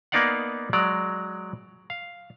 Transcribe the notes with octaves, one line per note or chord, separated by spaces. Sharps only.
A#3 B3 D#4 D5 F5 F#5
F#3 G#3 D5 A#5
F5